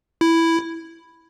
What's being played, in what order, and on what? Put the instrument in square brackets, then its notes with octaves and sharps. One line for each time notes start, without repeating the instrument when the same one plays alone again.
[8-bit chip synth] E4